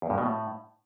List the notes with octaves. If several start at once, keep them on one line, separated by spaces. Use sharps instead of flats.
E2
G2
B2
A2